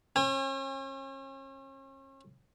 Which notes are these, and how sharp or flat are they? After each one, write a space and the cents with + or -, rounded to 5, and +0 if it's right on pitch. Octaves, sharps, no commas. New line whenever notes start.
C#4 -40 G#5 -45